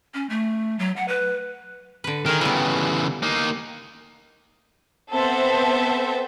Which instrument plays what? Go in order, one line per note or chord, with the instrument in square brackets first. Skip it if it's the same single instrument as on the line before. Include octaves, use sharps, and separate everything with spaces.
[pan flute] C#4
A3
F#3
F#5
B4
[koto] D3 B4
[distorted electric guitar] D#3 [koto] G#4 A#4
[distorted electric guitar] C#3 E3 [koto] G3 B3
[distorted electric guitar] A#3 D#4
[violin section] B3 C4 A4 C5 E5